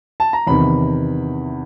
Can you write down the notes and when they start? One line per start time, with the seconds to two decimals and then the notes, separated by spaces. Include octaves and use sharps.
0.20 A5
0.33 A#5
0.47 E2 C3 D#3 B5